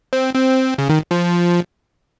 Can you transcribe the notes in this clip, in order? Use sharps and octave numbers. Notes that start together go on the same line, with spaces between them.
C4
C4
C#3
D#3
F3